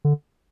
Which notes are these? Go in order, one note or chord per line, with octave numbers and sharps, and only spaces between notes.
D3